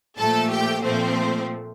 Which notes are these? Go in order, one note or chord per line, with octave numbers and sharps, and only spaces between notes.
A#2 F3 A3 A4 A5
G4 G5
A#2 F3 A3 C4 C5